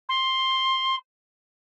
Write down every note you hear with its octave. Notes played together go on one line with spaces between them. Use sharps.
C6